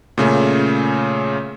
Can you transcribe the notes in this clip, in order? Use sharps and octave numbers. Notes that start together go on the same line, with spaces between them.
A#2 C#3 A3 C#4